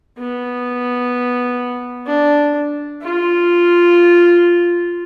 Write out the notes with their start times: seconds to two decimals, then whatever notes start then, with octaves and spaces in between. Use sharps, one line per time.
0.18 B3
2.06 D4
3.02 F4